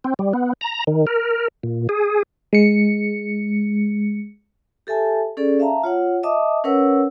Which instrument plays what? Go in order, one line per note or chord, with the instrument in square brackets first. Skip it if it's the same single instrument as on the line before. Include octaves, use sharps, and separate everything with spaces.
[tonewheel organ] C4
G3
B3
A#5
D#3
A#4
A#2
G#4
[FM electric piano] G#3 C#7
[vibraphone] G4 A4 E5 G#5 A5
C#4 G#4 A4 D5
E5 F5 A5 A#5
F4 C#5 F#5
D#5 E5 A5 D6 D#6
C#4 A#4 B4 C#5 F#5 E6